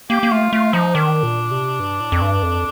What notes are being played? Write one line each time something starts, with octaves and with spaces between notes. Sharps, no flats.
A#3 G4
A#3
A3 F4
A3 F4
F3 D#4
D#3 D4
A#2
C3
G2
A2
F2
G2
F2